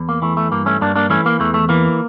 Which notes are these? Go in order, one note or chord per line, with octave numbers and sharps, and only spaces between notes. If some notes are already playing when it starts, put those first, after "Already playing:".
Already playing: E2
A#3
E3 A3
A3
G2 A#3
A3 C#4
G2 A#3 D4
A#3 D4
E3 A3 C#4
A#3
E2 A3
A3
E3 A#3